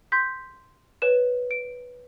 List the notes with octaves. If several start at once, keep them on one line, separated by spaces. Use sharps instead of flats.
C6 G6 B6
B4 C#5 E7
D7